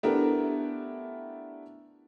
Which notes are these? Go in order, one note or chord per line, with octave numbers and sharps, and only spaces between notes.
A3 B3 D4 E4 G4 A#4